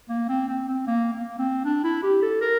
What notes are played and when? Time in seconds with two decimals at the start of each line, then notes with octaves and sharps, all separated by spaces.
0.09 A#3
0.29 C4
0.48 C4
0.68 C4
0.87 A#3
1.13 A#3
1.39 C4
1.65 D4
1.84 E4
2.03 G4
2.22 A4
2.41 A#4